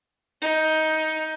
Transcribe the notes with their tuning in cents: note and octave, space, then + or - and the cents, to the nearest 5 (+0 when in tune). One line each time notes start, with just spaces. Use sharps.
D#4 +15